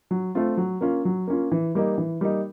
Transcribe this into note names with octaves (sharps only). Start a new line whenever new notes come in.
F#3
A3 C4 F4
F#3
A#3 C#4 F4
F#3
A#3 C#4 F4
E3
G3 A#3 D#4
E3
G3 A#3 D#4